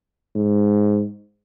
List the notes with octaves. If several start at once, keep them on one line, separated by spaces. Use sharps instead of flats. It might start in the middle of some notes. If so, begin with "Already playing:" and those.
G#2